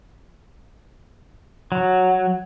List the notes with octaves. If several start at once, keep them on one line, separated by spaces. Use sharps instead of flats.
F#3